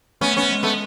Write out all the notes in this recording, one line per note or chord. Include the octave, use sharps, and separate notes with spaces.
A3 B3 C#4
B3 C#4
A3
G#3
A3 B3